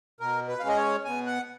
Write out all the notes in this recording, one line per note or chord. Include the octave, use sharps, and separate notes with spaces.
B2 A#4
B4
G#3 C#4 F5
D#5
C#5
B2 G#5
F#5